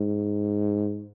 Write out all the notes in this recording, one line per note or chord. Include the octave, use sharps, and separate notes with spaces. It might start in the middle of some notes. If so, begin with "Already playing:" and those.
Already playing: G#2